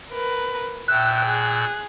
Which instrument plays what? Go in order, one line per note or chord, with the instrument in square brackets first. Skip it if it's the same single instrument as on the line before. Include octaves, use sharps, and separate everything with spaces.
[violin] A#4 B4
[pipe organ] A#2 E6 G6 [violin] E5 G5 [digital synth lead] F#6
[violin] G#4